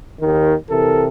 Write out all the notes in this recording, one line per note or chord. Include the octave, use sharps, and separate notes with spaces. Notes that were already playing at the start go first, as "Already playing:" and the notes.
D#2 D#3
C3 E3 A4 A#4